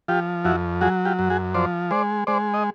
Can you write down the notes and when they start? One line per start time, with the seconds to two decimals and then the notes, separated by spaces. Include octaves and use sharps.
0.08 F3 F4 G4
0.45 F2 E4 F#4
0.81 F#3 F#4 G#4
1.05 F4 G4
1.19 F#2
1.30 F#4 G#4
1.54 F3 C5 D5
1.91 G#3 C5 D5
2.27 G#3 C5 D5
2.54 D#5